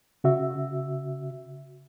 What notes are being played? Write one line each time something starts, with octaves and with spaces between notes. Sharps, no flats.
C#3 F#4 E5